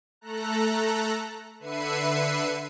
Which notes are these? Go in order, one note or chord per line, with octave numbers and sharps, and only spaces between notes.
A3 A4 A#5 F#6
D3 B4 E5 C7 C#7 D#7